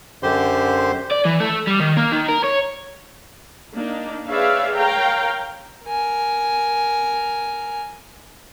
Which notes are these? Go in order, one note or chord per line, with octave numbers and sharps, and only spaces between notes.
F#2 D3 G4 C5 C6
D5
E3
A3
G3
D#3
A#3
D#3
A#4
C#5
A#3 D4 D#4
G#4 B4 C#5 D5 E5 F5
A#4 C#5 F5 G5 A#5
A#4 G#5